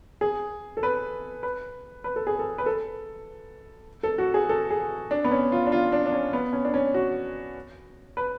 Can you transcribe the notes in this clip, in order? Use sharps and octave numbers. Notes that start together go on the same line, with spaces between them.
G#4
A4
B4
B4
B4
A4
G#4
A4
B4
A4
A4
F#4
G#4
A4
G#4
D4
B3
C#4
F4
D4
F4
D4
D4
C#4
B3
C#4
D4
C#4
F#4
B4